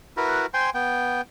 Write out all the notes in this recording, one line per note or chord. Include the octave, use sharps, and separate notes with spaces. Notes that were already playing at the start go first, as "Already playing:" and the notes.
E4 F#4 A#4 B4
C5 G5 G#5 C6
B3 G5